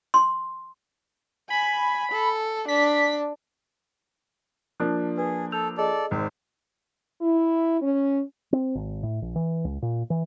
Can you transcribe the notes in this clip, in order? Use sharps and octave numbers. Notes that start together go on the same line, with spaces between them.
C6
G#5 B5
A4
D4 B6
F3 A#3 D4 F#6
G#4 B4
A4 E6 G6 F7
G#4 A4 D5 D#5
G#1 C4
E4
C#4
C4
G#1
A2
A#1
E3
C#2
A#2
E3